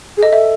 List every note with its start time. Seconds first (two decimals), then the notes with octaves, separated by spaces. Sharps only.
0.17 G#4
0.23 A4 D#5
0.33 E5